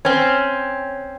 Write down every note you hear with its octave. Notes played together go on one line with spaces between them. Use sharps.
C4 C#4